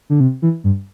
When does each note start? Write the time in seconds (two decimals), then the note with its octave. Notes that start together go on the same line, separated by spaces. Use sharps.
0.10 D3
0.20 C3
0.42 E3
0.64 G2